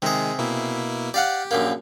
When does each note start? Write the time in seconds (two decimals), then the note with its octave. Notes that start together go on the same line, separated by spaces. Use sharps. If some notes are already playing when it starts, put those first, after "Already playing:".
0.02 C3 D#3 G#3 G#4
0.38 B2 A#3 E4
1.14 G4 D5 F5 F#5
1.51 A#1 F#2 A#3